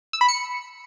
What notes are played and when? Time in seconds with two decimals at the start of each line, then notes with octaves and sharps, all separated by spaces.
0.13 E6
0.21 B5
0.29 C#7